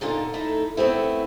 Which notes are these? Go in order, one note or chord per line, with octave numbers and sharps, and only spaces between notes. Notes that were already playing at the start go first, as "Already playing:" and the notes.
A#2 D3 D#4 F4
A3 D#4 E4
A3 B3 C4 E4